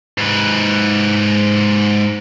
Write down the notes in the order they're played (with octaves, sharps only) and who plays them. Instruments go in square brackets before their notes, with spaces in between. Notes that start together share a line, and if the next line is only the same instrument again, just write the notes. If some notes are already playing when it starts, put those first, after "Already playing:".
[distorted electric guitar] G#2 B4